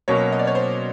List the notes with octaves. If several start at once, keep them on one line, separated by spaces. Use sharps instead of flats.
B2 F#3 A#3 C#4 C#5
D#5
D5
C#5
C5